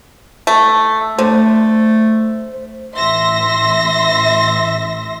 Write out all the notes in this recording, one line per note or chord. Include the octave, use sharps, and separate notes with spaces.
A3
D3 A3 C5
A1 E5 C6 A#6